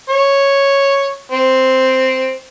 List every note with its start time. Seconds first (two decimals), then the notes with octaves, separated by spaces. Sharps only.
0.09 C#5
1.31 C4